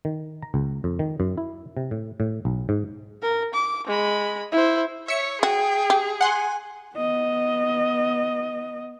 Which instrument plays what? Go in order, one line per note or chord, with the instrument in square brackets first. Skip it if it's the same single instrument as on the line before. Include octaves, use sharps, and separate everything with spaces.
[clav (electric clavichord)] D#3
A#5
C#2
F2
D#3
F#2
E4
C3
A2
A2
B1
G#2
[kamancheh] A#4
D6
G#3 B5
E4 C5
[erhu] C#5 [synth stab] E5 C#7
[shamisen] F#4 [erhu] G#4 [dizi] G5
[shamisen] G4
[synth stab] F#5 C6 [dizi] G#5
[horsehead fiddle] B3 D#5